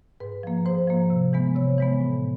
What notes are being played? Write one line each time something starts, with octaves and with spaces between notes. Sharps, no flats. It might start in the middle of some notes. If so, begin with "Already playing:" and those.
G#2 B4
F3 A#3
G#2 C5
F3 A#3
C3
E3 G#3 B3
C3 C#5
E3 G#3 B3
A2